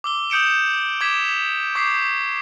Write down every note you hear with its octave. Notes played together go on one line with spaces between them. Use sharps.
D6 E6 G7
D#6 G6 C#7 D7 E7
D6 G#6 B6 D7 E7
C#6 D6 G6 B6 C7